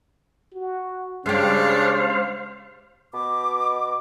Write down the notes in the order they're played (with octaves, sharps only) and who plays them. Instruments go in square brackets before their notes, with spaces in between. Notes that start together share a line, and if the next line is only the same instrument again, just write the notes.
[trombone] F#4
[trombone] C#3 [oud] G#3 G4 [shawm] D4 [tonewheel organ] C5 F5
[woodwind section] B2 D6